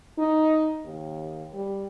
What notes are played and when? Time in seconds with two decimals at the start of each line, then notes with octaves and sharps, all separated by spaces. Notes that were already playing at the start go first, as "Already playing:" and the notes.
0.18 D#4
0.84 D#2
1.54 G3